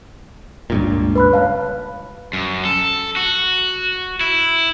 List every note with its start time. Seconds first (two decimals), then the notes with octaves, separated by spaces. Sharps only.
0.70 C#2 G2 A#2
1.16 B4 B5 F#6
1.32 C#5 F5 A5
2.33 F#2
2.65 A4
3.16 F#4
4.21 E4